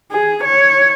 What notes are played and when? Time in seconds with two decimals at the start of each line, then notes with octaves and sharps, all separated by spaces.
0.12 G#4
0.45 C#5